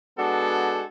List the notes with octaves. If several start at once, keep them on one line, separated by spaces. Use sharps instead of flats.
G#3 B3 D4 F#4 A4